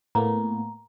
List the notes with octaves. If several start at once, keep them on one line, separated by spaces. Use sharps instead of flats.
A2 A#3 B3 A#5